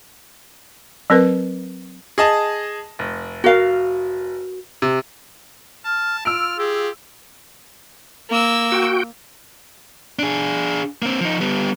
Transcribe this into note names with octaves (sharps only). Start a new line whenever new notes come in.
F#3 C4 A#4 B4
G#4 D#5 A5
F1
F#4 A#4 F5
C3
A5 F6
F4 E6 F6 D7
G4 G#4
A#3 E6
F#4 G5
D4 G#4
A#3 C4
F3 D#4
G3 B3